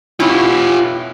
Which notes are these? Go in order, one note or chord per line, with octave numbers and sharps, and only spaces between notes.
B2 C#4 E4 F4 G4